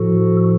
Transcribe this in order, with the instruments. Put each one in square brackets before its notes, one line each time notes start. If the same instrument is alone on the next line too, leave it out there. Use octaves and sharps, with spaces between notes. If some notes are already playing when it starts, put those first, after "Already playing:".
Already playing: [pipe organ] A2 F3 F#4 A4